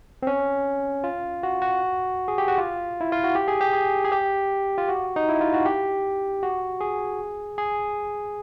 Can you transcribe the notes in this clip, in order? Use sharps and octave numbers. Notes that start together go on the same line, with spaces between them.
C4
C#4
F4
F#4
F#4
G#4
G4
F#4
F4
E4
F4
F#4
G4
G#4
G4
G#4
G#4
G4
F4
F#4
D#4
E4
F4
F#4
G4
F#4
G#4
G#4